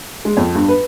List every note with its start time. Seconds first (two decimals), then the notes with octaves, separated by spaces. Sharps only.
0.25 G#3
0.37 F2
0.55 G2
0.68 B4